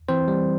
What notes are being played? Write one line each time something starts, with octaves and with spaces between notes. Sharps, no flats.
E3 C4 C5
G3